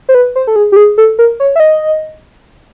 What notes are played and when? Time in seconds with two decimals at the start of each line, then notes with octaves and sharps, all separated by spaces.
0.09 C5
0.15 B4
0.36 C5
0.47 A4
0.56 G#4
0.72 G4
0.76 G#4
0.98 A4
1.19 A#4
1.40 C#5
1.56 E5
1.60 D#5